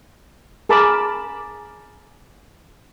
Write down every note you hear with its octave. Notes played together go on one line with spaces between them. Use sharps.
G#4 A#4 A5 B5 D6